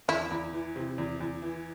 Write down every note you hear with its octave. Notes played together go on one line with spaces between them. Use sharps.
E2 E4
E2
E3
C3
E2
E2
E3